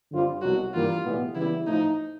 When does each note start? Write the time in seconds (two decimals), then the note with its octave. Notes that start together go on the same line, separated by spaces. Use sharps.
0.12 F#2 D3 G3 C4 F4
0.42 C2 B2 F#3 F#4
0.73 G2 E3 G3 A#3 F4
1.04 B1 A2 E3 G3 B3
1.35 C#3 E3 G3 B3 E4
1.66 A2 F3 A3 D#4